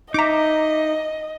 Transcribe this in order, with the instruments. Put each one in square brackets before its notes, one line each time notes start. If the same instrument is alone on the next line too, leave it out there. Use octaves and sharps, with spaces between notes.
[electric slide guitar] D#4 E5 [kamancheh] D#5 [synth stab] A#5 D6